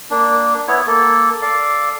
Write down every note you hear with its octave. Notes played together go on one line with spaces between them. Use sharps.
A#3 D4
B3 E4 C#5
A#3 A4
A4 D5 F5